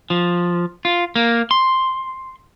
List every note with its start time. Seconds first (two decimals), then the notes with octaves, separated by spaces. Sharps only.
0.10 F3
0.85 F4
1.16 A#3
1.51 C6